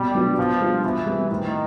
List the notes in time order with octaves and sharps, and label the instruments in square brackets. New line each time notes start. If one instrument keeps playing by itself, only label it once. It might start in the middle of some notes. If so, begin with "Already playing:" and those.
Already playing: [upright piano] B2 [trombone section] G3
[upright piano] F#3 B3 D4 F4
[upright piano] B2 [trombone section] F3
[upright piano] G3 B3 D4 F4
[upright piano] B2 [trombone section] E3
[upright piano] G3 C4
[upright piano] A2 [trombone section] D#3